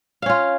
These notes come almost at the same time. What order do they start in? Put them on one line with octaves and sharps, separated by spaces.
F5 C#4 F4